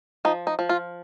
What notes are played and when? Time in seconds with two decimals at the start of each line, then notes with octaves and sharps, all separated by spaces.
0.25 F3 D#4
0.47 D#4
0.59 F3
0.69 F4